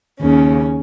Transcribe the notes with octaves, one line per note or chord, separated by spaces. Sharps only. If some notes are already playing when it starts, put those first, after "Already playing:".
D#2 C#3 C#4